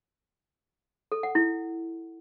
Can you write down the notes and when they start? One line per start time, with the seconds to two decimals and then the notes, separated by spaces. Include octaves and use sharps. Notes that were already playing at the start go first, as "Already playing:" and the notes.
1.12 A4
1.23 F#5
1.35 E4